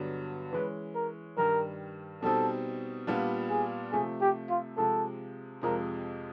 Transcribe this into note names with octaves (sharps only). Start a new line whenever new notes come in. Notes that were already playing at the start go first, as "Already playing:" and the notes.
Already playing: G2 D3 F#3 B3
E3 G#3 C#4 B4
A#4
G2 D#3 G3 A#4
B2 G3 C4 D#4 A4
A#2 G3 B3 D4 F4
G#4
C3 F3 A3 G#4
G4
F4
C3 F3 G#3 A4
F2 C3 F3 G#3 A#4